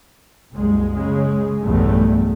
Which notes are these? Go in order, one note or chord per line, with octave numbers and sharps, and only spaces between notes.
F#1 C2 G#3
C#3 G#3
B1 E2 G2 A3